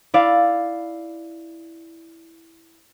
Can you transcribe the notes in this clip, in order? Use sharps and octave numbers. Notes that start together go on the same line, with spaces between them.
E4 D5 F5